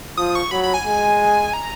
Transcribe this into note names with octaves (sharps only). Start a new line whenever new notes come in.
F3 D#6
C#6
F#3 B5
B5
G#5
G#3
A#5